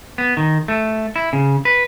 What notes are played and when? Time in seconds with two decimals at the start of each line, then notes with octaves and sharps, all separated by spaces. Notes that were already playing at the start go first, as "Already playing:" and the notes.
0.18 B3
0.37 D#3
0.68 A3
1.16 E4
1.33 C#3
1.65 B4